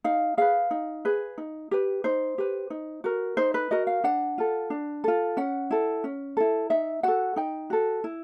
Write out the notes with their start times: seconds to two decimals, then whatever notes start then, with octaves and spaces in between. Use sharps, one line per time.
0.04 D#4 F5
0.37 G#4 B4 F5
0.71 D#4
1.05 G#4 B4
1.38 D#4
1.71 G4 B4
2.04 D#4 C5
2.38 G4 B4
2.70 D#4
3.04 F#4 A#4
3.37 D#4 C5
3.54 B4
3.71 F#4 A#4 D#5
3.87 F5
4.04 D4 F#5
4.38 F4 A4
4.70 D4
5.04 F4 A4
5.37 C#4 F#5
5.71 E4 A4
6.04 C#4
6.37 E4 A4
6.70 D#4 E5
7.03 F#4 A4 F#5
7.36 D#4 G5
7.70 F#4 A4
8.04 E4